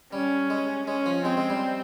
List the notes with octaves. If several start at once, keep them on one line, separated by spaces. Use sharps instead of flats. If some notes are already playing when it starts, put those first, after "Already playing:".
G3 C#4
G#3
G#3 C#4
F3
G#3 C4
G#3
G3